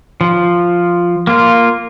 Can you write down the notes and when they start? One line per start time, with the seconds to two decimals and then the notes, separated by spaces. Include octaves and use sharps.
0.21 F3
1.27 A#3 F4